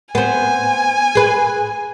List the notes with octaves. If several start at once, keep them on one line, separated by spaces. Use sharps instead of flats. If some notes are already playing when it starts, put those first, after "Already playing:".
B3 C4 G#5
G#4 B4